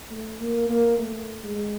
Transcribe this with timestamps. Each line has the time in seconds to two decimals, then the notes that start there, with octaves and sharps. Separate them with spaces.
0.11 A3
0.41 A#3
0.69 A#3
0.99 A3
1.44 G#3